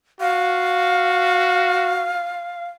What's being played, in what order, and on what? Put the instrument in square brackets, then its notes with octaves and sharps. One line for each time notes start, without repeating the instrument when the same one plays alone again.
[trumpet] F#4 [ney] F5